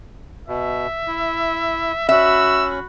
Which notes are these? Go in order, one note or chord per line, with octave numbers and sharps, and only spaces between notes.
B2 E5
E4
C#4 F#4 E5 B5 E6